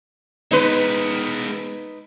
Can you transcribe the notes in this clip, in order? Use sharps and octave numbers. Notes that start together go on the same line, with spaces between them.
G#3 B3 D#4 B4